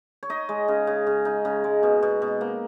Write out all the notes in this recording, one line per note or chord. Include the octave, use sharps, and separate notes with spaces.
C#5
D#4 D#5
G#3
C#3
C#3
C#3
D#4
C#3
G#3
B2
B2
B2
A#3